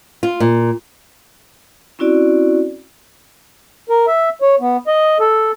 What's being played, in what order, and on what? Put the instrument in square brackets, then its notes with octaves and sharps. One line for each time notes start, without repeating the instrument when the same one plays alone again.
[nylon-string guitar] F4
A#2
[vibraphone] C4 C#4 E4 F#4 D5
[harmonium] A#4
E5
C#5
B3
D#5
A4